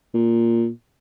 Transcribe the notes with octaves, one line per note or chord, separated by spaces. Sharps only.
A#2